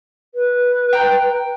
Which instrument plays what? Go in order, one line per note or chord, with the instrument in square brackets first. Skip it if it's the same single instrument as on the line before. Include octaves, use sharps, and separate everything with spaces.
[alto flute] B4
[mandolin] G5 A#5 F6